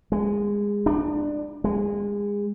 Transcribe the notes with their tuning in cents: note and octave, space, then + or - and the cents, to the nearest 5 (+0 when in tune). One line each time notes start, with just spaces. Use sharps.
G#3 -20
D4 +20
G#3 -30